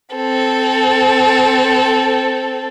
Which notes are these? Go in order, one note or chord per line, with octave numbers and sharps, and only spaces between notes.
C4 A4